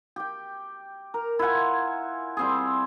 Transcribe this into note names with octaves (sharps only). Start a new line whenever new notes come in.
G4 G5
A#4
E4 F4 F#5 G#5
G3 C4 G#4